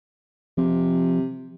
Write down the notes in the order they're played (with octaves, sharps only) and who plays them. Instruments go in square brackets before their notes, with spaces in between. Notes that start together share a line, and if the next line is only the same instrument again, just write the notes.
[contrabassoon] C3 [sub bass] F3